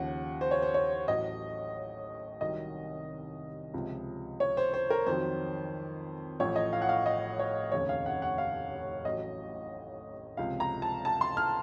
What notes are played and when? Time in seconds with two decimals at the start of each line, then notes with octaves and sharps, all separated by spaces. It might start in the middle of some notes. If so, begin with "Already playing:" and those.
Already playing: D#2 C#3 F3 F#5
0.41 C5
0.51 C#5
0.62 C5
0.74 C#5
1.07 A1 A2 F#3 D#5
2.40 C2 C3 D#3 F#3 D#5
3.74 C#2 C3 F3
4.40 C#5
4.57 C5
4.74 C5
4.90 A#4
5.06 F2 D#3 F#3 C5
6.39 A1 A2 F3 C#5
6.56 D#5
6.73 F5
6.82 F#5
6.89 F5
7.06 D#5
7.39 C#5
7.72 F1 D#2 C#3 C#5
7.89 F5
8.06 F#5
8.22 F#5
8.38 F5
9.04 A1 A2 F#3 D#5
10.37 C#2 C3 F3 F5
10.60 A#5
10.82 A5
11.05 A5
11.21 C6
11.37 F6